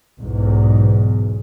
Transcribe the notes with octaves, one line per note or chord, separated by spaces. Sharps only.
B1 E2 G#2